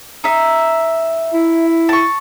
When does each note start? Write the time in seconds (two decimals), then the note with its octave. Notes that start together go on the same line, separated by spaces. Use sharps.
0.24 D#4 E5
1.33 E4
1.89 A5 C#6